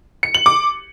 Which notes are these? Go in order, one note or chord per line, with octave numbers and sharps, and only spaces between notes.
C#7
F#7
D6